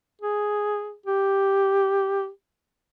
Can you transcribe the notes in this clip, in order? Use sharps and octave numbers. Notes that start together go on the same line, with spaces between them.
G#4
G4